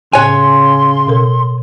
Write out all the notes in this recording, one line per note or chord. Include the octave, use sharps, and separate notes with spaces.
A2 C#3 C#5 G#5 C6 F#6
B2 A4 A#4